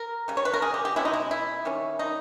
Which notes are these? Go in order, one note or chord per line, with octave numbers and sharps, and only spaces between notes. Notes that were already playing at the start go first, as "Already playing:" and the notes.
Already playing: A#4
C#3 G3
C#5
B4
A#4
G#4
G4
G4
B2 G#3 C#4 E4
D#4
E4
E4
D#3 G3 C#4
D#4